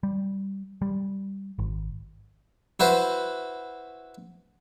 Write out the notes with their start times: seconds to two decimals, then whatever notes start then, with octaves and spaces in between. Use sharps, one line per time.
0.03 G3
0.82 G3
1.59 G#1
2.80 E4 F#4 B4 C5